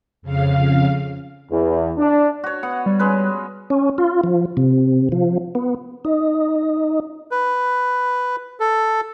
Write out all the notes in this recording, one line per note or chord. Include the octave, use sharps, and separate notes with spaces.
F2 C#3 F5
E2
D4
F#4 C#5
B3 F#5
G3
G#3 C#4 B4
C#4
F4
F3
C3
F3
B3
D#4
B4
A4